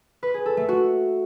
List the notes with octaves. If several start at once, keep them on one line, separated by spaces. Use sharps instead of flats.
B4
G#4
A4
A3
F#4